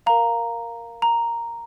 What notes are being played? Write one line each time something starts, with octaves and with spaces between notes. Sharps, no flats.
A#4 F5 A#5
A#5